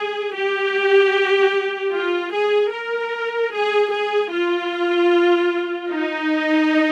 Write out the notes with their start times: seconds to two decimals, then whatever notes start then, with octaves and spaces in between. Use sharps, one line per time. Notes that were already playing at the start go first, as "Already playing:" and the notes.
Already playing: G#4
0.34 G4
1.93 F4
2.32 G#4
2.72 A#4
3.52 G#4
3.91 G#4
4.31 F4
5.90 D#4